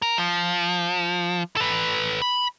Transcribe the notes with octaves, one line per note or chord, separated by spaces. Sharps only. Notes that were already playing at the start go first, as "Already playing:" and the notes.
A#4
F3
A4 B4
B5